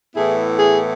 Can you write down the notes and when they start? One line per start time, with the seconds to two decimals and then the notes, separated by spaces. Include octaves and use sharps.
0.14 A2 E3 B3 E4 G#4
0.59 G#4